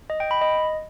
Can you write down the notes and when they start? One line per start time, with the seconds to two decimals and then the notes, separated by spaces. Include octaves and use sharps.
0.10 D#5
0.20 G5
0.31 B5
0.41 D#5